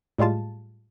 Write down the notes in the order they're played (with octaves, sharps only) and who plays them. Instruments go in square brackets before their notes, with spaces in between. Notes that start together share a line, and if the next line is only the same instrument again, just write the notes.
[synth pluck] A2 G3 G#3 F4 A5